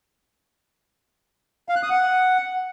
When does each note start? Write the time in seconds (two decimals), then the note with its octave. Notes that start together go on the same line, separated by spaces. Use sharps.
1.69 F5
1.76 F#6
1.83 D#6
1.90 F#5